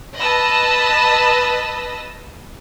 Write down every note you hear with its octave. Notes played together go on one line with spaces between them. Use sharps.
B4 D#5 A5 B5 E6 A#6